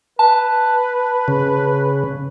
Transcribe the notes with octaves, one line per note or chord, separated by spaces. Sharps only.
B4 A5
C#3